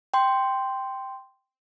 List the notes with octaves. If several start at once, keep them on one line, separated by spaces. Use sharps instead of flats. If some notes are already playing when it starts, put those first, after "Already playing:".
G5 C6